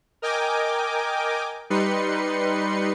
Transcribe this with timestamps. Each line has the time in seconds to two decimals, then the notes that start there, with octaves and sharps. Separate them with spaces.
0.22 A#4 D#5 G5 G#5 D6
1.70 G3 D#4 B4 C6 C#7